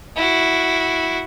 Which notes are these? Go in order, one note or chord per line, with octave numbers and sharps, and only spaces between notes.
E4 F#4